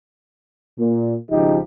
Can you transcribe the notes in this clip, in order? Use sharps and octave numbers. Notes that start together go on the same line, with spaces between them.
A#2
G#1 C#3 F3 D#4 G4